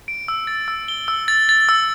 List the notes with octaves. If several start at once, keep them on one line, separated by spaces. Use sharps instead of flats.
D7
E6
A6
E6
G7
E6
A6
A6
E6